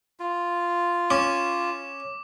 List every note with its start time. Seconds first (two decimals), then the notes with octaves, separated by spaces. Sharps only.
0.20 F4
1.10 C#4 D6